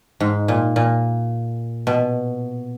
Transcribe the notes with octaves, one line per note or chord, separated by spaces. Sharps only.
G#2
A#2
A#2
B2